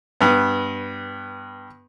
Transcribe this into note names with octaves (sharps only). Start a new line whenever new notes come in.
G2 B3